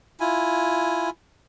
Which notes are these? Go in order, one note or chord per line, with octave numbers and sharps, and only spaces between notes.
E4 F4 G#5